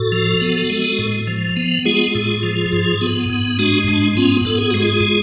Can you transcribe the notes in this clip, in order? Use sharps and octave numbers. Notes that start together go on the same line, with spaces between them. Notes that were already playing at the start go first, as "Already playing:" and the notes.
Already playing: A2 F#4 A4
F3
B3
G#3
A2
F3
B3
G#3 F4 G#4
A2
F3
G#2
B3
G#2
G#3 D4 F#4
G#2 D4
B3 C#4 F4
G#2 A4
G#4
G#3 F#4
F4 G#4